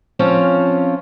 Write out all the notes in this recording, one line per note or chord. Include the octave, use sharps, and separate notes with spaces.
F3 C4 C#4 F4 C#5